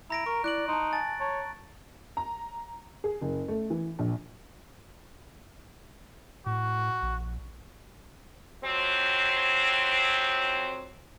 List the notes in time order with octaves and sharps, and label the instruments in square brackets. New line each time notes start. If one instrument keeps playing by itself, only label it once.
[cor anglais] E4 [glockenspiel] A#5 A#6 D7
[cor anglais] A#4 [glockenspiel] C#6
[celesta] E4 [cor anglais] D5 [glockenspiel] F#6 D7 F#7
[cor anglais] D#4 [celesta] A5 C6
[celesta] G#5 A5 [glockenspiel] A6
[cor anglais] C#5 [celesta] A5 A#5
[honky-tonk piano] A#5
G#4
F#1
A3
E3
A#1
[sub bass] A2 [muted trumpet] F#4
[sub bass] A#1
[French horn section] F2 F#3 C4